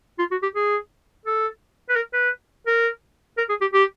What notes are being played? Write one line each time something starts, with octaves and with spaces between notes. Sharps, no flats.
F4
F#4
G4
G#4
A4
B4
A#4
B4
A#4
A#4
G#4
G4
G4